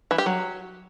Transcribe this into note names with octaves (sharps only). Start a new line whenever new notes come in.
E3
G4
F#3